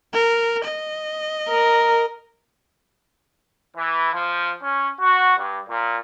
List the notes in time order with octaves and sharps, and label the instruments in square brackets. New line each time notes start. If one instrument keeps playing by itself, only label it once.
[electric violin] A#4
D#5
[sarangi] A#4
[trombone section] E3
F3
C#4
F#4
G2
A#2